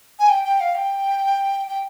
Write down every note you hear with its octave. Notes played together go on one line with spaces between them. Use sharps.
G#5
G5
G5
F5
G5
G5